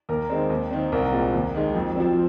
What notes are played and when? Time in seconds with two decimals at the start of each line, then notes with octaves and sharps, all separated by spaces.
0.09 D#2 A#4
0.30 D#3 G#3 C4
0.50 D#2
0.71 D#3 C4
0.92 C2 A#4
1.13 A#2 G#3 C4
1.33 D#2
1.55 D#3 G#3
1.75 F2
1.96 F3 C4